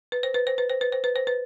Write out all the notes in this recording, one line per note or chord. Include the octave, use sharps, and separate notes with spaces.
B4
C5
B4
C5
B4
C5
B4
C5
B4
C5
B4